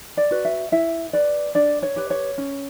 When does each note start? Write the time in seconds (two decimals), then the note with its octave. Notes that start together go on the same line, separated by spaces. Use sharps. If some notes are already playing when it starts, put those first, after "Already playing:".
0.17 D5
0.31 F#4 B4
0.45 E5
0.72 E4 E5
1.13 B4 D5
1.55 D4 D5
1.83 C#5
1.96 G4 B4
2.10 C#5
2.38 C#4